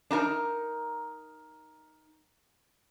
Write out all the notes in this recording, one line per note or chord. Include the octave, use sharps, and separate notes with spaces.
D4 D#4 A#4 A#5